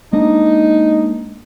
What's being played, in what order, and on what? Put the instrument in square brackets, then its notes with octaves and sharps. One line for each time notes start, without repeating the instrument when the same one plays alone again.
[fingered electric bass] G#3 A#3 D4 [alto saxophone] D#4